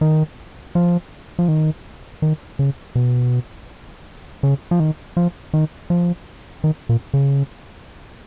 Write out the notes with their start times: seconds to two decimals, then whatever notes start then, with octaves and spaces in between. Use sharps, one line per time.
0.01 D#3
0.75 F3
1.39 F3
1.48 D#3
2.22 D#3
2.59 C#3
2.95 B2
4.43 C#3
4.71 F3
4.80 D#3
5.17 F3
5.54 D#3
5.90 F3
6.64 D#3
6.89 A#2
7.14 C#3